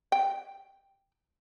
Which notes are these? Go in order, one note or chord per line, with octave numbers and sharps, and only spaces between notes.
G5